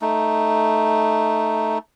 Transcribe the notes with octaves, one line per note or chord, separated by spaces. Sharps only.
A3 D#4